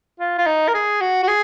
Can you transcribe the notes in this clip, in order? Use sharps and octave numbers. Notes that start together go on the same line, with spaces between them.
F4
F4
D#4
A#4
G#4
F#4
F#4
G#4